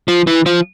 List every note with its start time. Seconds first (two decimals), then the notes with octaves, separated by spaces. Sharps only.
0.08 F3
0.27 E3
0.46 F3